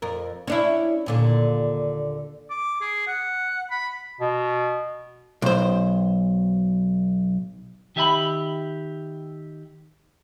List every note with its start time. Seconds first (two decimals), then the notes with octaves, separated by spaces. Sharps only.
0.02 F2 A#4
0.47 C#4 D4 E4
1.06 D#2 A#2 D3
2.50 D6
2.81 G#4
3.07 F#5
3.70 B5
4.21 B2
5.42 B1 C5
7.96 D#3 G4 E5 G#5 B5